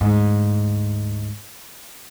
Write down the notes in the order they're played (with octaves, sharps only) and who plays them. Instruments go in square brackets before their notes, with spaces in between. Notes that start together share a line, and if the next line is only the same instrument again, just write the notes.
[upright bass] D2 G#2